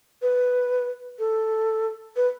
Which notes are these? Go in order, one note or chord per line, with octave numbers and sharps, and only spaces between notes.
B4
A4
B4